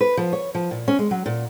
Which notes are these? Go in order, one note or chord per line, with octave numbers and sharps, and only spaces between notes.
B4
F3
C#5
F3
A#2
C#4
G#3
F#3
A#2